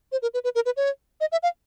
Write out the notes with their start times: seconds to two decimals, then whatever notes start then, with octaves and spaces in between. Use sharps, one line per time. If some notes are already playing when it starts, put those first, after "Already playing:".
0.12 C5
0.22 A#4
0.34 B4
0.44 B4
0.55 A#4
0.66 B4
0.77 C#5
1.21 D#5
1.32 E5
1.43 F5